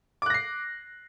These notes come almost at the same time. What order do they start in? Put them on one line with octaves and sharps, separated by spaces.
D6 F#6 A#6 C7